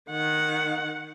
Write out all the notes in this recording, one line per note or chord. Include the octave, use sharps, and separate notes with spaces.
D#3 F#5